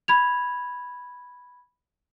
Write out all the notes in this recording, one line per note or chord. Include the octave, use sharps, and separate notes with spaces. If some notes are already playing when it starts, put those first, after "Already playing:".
B5 G#6 F7